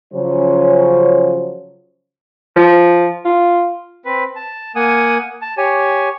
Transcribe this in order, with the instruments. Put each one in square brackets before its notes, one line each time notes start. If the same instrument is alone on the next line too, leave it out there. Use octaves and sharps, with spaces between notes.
[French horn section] C#3 F3 F#3 C#4 C5 C#5
[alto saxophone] F3
F4
[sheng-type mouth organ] C4 B4
A5
A#3 F#5 G#5 D#6
A5
G4 C#5 G#5